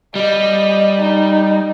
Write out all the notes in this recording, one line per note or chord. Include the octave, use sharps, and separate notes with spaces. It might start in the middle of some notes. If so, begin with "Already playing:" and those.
G3 D#5
D#4